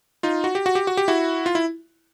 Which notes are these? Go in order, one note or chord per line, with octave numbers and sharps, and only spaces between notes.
D#4 F4
F#4
G4
F#4
G4
F#4
G4
E4 F#4
F4
E4